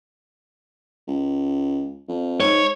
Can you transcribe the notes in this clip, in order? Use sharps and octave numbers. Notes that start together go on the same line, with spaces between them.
C#2
F2
G#2 C#5